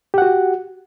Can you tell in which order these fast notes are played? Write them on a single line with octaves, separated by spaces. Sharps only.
G4 F#5 F#4